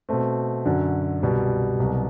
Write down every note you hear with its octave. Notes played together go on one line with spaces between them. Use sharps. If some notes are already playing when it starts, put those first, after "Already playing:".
B2 A3 C4
F#2 D3 F#3
C2 B2 G3
C2 B2 F#3